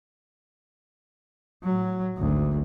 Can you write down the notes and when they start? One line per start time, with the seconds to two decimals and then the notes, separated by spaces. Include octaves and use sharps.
1.63 A2 F#3
2.16 G#1 D2